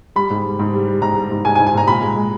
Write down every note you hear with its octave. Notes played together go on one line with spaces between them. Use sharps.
G3 B5
G#2
G3
G#2
G3
G3
G#2 A#5
G3
G#2
G#2 G#5
G#5
G#2
G#5
G#2 A#5
A#2 B5
G#3
G#3